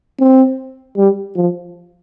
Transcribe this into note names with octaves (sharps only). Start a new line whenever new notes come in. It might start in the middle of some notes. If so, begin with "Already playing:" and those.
C4
G3
F3